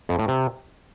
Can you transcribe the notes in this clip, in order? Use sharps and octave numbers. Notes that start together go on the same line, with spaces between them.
F2
A2
C3